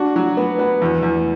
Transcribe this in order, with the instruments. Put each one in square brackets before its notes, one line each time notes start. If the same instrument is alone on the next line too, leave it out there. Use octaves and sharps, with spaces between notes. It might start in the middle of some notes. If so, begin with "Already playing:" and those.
Already playing: [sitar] D4 [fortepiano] F#4
[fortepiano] F#3
B3
B3
E2
E2